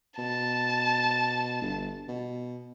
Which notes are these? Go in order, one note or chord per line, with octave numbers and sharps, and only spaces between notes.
B2 A5
G1
B2